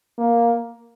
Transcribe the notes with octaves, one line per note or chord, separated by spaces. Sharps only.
A#3